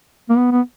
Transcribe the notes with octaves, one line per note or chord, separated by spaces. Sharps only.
A#3
B3
B3